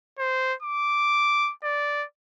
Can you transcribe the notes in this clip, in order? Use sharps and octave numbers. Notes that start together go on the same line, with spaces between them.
C5
D6
D5